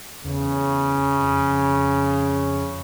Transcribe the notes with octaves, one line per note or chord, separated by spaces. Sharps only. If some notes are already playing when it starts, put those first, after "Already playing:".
E2 C#3
F2